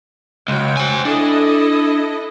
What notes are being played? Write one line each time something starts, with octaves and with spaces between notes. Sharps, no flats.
C#2 F#3 G5
C5 G#5
D4 E4 A4 D#5